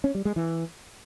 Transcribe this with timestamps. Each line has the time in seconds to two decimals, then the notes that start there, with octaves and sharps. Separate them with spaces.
0.04 C#4
0.15 G3
0.25 G#3
0.36 E3